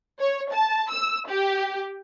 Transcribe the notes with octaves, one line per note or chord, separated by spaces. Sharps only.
C#5
A5
E6
G4